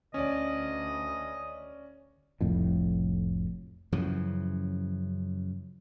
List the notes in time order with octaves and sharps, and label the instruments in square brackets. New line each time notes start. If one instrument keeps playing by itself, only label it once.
[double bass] D2 [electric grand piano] C#4 D5 [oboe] D#5
[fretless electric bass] F1 C2 F2 A2
[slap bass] F#2 C#3 E3 F3